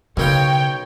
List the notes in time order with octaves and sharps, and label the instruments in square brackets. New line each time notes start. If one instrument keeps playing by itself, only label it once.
[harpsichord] B1 A#4 F5 [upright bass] C#3 [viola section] C#5 G5